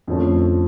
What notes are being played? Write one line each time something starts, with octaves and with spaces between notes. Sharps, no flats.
F2 D3 F3 A3 C#4